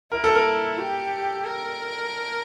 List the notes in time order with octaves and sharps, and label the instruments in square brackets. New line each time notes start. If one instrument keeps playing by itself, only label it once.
[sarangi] E4 [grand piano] A#4
[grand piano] A4
A#4
[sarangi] G4
A#4